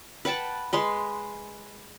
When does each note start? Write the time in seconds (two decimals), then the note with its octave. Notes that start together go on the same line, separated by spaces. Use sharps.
0.25 B4 F#5 G5 A5
0.73 G#3 B4 C6